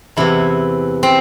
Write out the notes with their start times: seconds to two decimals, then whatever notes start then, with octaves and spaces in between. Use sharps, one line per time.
0.17 E2 C3 E3 E4
1.03 C4